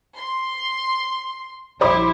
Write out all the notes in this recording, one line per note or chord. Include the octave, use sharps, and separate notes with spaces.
C6
A#1 G3 E4 C5 B5 D6